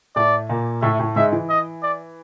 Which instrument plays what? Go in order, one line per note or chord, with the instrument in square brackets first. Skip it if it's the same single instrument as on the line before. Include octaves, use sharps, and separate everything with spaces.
[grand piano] A2 A3 [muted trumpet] D5
[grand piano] A#2 A#3
[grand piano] A2 A3 [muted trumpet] E5
[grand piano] A2 A3
[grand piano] G#2 G#3 [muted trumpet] E5
[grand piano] E3
[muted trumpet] D#5
D5